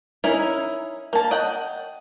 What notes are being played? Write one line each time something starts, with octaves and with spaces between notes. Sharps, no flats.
C#4 D#4 E4 A#4
A#3 A5
D#5 F#5 G5